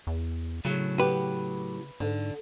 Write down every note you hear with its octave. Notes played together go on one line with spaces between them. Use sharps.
E2
A2 C#3 F#3
B3 G4 B4
G#2 D3